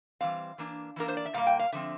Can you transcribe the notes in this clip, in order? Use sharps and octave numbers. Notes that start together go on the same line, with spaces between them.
E3 G3 C4 F5
E3 A#3 D4
E3 A#3 D4 A#4
C5
D5
E5
A#2 G3 A#3 F5
G5
F5
D3 F3 C4 E5